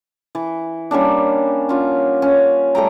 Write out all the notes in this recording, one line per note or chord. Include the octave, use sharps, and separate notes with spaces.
E3
G3 A#3 C#4 D4
C#4 F4 F#5
C#4
G3 A3 G5 A#5